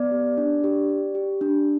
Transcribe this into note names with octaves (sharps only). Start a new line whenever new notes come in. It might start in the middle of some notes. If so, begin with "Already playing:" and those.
Already playing: B3 D5
G4
D4
G4
G4
G4
D4